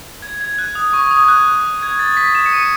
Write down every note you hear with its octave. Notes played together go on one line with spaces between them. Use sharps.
G#6
G#6
F#6
D#6
C#6
D#6
G#6
F#6
G#6
A6
B6
E7
C#7
D#7